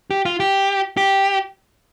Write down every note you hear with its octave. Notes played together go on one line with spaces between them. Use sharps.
G4
F4
G4
G4